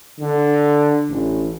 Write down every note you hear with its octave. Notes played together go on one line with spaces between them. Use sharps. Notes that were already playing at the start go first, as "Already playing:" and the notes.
D3
A1